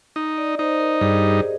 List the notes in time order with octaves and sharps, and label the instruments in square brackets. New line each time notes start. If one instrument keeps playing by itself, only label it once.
[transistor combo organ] D#4 [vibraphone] D#5
[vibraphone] D5
[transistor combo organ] D#4 [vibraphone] C5
[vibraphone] A#4
[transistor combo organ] G2 [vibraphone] G#4
[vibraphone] G4
G#4